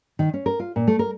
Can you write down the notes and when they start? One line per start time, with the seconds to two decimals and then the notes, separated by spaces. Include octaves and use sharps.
0.19 D#3
0.34 C#4
0.46 A#4
0.60 F4
0.76 A#2
0.87 A3
0.99 A#4